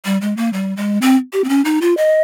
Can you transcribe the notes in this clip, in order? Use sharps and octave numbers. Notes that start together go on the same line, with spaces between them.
G3
G#3
A#3
G3
G#3
C4
G4
C4
C#4
D#4
F4
D#5